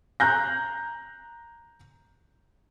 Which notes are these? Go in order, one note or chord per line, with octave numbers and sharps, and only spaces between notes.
A#5 F#6 G6 A#6